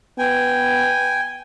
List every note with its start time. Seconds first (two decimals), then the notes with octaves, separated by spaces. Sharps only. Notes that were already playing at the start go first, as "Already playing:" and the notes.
0.19 B3 G5 G#5